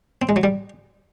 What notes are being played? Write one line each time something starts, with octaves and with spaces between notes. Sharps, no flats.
C4
G#3
F#3
G3